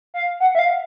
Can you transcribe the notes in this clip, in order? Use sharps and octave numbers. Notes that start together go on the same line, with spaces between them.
F5
F#5
E5
F5